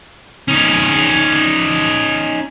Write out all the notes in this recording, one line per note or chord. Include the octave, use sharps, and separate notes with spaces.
C#4 D#4